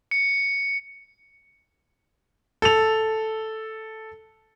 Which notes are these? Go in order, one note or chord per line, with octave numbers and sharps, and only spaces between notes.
C#7
A4 F7